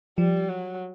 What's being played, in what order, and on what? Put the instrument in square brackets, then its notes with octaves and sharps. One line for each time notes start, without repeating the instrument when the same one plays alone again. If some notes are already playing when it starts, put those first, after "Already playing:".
[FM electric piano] F3 [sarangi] G3
[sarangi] F#3